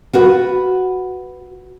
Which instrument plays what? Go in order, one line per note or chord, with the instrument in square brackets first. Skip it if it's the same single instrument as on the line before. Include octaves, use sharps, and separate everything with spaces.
[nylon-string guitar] F4 F#4 B4